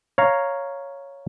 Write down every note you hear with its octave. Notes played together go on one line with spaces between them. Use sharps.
C#5 F5 A#5